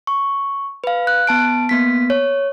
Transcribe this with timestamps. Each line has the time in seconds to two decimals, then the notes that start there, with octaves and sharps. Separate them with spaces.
0.07 C#6
0.84 B4 F5
1.07 F#6
1.27 B3 A5 D7
1.69 A#3 B3 B6
2.10 C#5